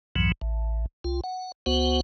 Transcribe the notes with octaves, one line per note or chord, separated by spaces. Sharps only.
B1 F2 G#2 E3 F#3
A1
C2 F4
F#5
C#2 B3 F#4 C5 F#5